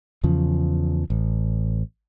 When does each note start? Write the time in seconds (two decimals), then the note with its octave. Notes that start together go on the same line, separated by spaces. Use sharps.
0.23 E2 C#3 F3
1.10 A1